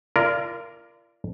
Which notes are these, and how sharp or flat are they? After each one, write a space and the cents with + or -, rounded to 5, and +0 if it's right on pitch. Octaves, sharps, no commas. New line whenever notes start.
F4 -35 A#4 +0 D5 +0